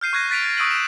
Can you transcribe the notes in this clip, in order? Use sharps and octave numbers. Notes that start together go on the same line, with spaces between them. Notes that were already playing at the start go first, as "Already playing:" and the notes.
F6 G6 C7 D#7
C#6 F#6 G#6 A#6 D#7
F#6 A6 B6 D7 D#7 F7
A6
C#6 D#6 E6 D7 D#7 F#7
E7